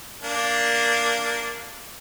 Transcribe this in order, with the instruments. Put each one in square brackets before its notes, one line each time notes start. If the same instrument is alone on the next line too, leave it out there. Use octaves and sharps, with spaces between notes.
[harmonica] A#3 D4